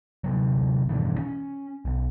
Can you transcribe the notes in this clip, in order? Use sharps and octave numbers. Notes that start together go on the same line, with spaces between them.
D1 C3 F#3
G2 B2 D#3 E3
C#4
B1